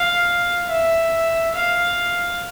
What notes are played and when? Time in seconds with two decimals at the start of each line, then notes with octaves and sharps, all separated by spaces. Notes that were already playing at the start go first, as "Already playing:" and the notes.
Already playing: F5
0.70 E5
1.55 F5